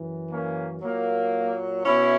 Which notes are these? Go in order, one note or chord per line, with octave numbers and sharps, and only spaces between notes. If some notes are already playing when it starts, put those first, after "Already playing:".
Already playing: F#2 E3
A#3 C#4
A#2 F#3 A#3
B2 C#4 E4